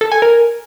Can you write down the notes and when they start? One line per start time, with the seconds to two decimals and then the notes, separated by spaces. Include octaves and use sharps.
0.01 A4
0.12 G#5
0.22 A#4